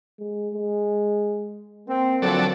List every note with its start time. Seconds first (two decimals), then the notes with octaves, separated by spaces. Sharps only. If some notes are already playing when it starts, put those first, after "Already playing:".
0.19 G#3
0.55 G#3
1.88 A#3 C4
2.22 D3 F3 F#3 C4 A4 D5